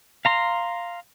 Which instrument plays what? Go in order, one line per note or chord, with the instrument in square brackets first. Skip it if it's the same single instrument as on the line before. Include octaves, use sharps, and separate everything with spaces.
[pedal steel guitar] F5 A#5 C6